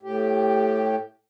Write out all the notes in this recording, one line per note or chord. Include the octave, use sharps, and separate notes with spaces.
A2 G4